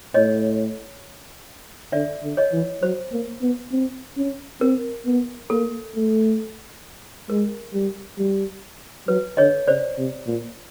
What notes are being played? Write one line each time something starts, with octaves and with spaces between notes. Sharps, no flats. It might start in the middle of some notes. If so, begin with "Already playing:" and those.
A2 C#5 D#5
D3 D5 E5
D3
C#5 D#5
E3
F#3 C5
A#3
B3
C4
C#4
C4 A#4
B3
A#3 A4
A3
G#3 A#4
G3
G3
F#3 B4
D3 C#5 D#5
C#3 C5 D5
C3
A#2